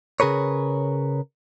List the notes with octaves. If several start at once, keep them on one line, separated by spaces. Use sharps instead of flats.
C#3 G#4 A#4 B4 C#5